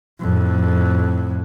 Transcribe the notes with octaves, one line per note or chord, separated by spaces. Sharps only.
F2 A2